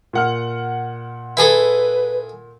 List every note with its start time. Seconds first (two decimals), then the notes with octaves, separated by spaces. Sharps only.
0.13 A#2 F#5 F6
1.37 E4 G#4 A4 B4